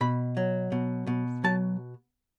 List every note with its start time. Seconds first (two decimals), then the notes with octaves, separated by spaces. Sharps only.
0.01 B2 B5
0.37 F#3
0.72 B2
1.07 B2
1.44 F#3 A5